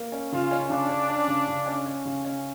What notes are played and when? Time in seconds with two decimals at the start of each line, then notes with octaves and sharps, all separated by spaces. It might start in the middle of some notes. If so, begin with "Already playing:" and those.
Already playing: A#3
0.12 C#4
0.32 C#3 F4
0.51 C#4
0.70 C#3 D4
0.89 C#4
1.09 C#4
1.28 C#3
1.48 C#3
1.66 C#4
1.86 C#4
2.05 C#3
2.25 C#4